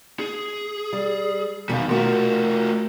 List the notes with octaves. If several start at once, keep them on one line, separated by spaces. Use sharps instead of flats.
G#4
G3
E2 B2 D#3 G3 F5
A3 F4 F#4 A#4